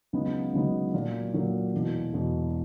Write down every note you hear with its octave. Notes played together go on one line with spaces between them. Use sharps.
C#2 C#3 F#3 B3 D#4
C#2 C#3 F#3 B3 D#4
A#2 F#3 A#3
A#2 F#3 A#3
E1 E2 B2
E1 E2 B2